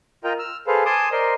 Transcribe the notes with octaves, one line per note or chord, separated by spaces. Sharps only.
F4 A#4 D#5 G5 A#5
E6 F6
G#4 A4 B4 C5 F5
G#5 A5 C6 D6 D#6
A#4 C5 D5 D#5 C6